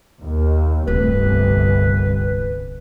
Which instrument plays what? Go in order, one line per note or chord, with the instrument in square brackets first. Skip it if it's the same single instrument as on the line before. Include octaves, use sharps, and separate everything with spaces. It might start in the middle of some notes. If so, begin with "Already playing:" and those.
[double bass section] D#2
[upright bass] D1 [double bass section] G1 C2 [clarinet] B4